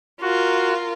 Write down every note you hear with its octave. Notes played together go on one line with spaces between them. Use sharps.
F4 F#4 A#4